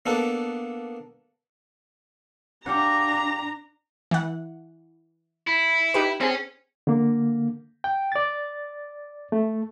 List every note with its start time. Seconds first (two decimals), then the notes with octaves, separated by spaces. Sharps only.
0.06 A#3 B3 D4 A4
2.66 D4 G4 F5 F#5 A#5
4.11 E3 F#5
5.47 E4
5.94 D#4 G4 B4
6.21 C4 C#4 G#4
6.87 D3 A#3
7.84 G5
8.12 D5 A6
9.32 A3